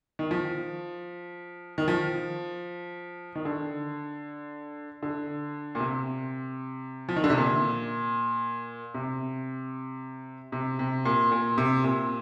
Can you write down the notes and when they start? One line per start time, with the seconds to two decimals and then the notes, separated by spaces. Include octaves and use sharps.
0.19 D#3
0.31 F3
1.78 D#3
1.88 F3
3.35 D#3
3.45 D3
5.03 D3
5.75 A#2
5.80 C3
7.09 F3
7.16 D#3
7.24 D3
7.30 C3
7.38 A#2
8.94 C3
10.52 C3
10.79 C3
11.05 A#2
11.32 A#2
11.58 C3
11.84 A#2